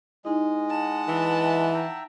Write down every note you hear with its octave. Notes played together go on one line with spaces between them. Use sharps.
G#3 D#4 E4 D#5
F#5 A5
E3
E5 G5 A#5